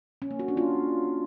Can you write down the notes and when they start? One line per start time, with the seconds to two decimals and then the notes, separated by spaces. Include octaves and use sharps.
0.22 C#4
0.31 A#3
0.39 F#4
0.48 D4
0.57 F4